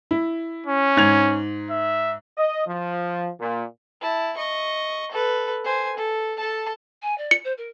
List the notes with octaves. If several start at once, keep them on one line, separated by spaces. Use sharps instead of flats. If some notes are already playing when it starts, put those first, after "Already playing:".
E4
C#4
G#2 G#6 F7
E5
D#5
F3
A#2
E4 A5
D#5 C#6
A4 B4
C5 G#5
A4
A4 A5
G#5
D5
C#7
C5
A#4